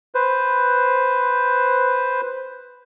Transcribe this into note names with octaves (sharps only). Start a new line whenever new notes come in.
B4 C5